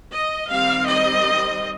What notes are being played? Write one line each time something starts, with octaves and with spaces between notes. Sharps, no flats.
D#5
D#3 G3 C4 F5
D#5